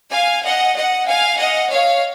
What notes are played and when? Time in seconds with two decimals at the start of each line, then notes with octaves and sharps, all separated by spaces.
0.12 F5 G#5
0.44 D#5 F#5
0.75 D#5 F#5
1.07 F5 G#5
1.39 D#5 F#5
1.71 C#5 F5